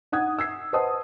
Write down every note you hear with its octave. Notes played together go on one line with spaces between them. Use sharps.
D#4 F#5 D#6 G#6
E6 G#6 C7
B4 C5 D#5 F#5 A5 D#6